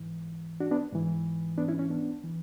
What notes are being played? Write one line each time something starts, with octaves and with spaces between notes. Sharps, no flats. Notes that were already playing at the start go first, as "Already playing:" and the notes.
Already playing: G#2 E3
D4 F#4
B3 D4
G#2 E3
B3 D4
C#4 E4
C#4
B3 D4
E3